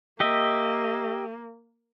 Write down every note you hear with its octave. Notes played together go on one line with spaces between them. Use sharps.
A#3 G4 D#5 E5